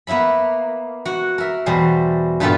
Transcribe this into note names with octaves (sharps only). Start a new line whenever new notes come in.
A#3 B3 E4 E5 B5
F#4 F#5
A#4 E5
E2 B2 G3 C5
G2 A#2 B3 F4 G4 A4